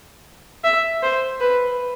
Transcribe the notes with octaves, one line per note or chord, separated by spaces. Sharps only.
E5
C5
B4